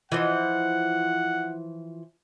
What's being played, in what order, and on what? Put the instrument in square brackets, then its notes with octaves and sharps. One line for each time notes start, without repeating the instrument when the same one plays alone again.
[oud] E3 F3 D#5 [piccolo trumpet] F#5